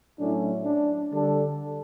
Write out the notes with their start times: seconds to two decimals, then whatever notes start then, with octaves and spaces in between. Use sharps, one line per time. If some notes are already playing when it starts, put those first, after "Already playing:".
0.18 A2 F#3 C#4 D4 E4 A4
0.65 D4
1.11 D3 G3 D4 A4